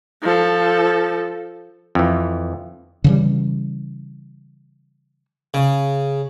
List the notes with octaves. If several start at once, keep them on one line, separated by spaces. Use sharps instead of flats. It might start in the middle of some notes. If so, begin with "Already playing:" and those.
F3 A4
F2 E3
C#3 E3 G3
C#3